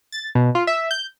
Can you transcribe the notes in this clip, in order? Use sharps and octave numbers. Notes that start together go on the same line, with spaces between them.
A6
B2
F4
E5
G6